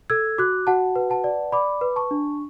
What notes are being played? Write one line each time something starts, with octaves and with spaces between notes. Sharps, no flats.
A4 E6 G#6
F#4 D6 F#6
F#4 F#5 A5
B4
F#5 A5
D5
D5 B5 D6
B4
A5 C#6
D4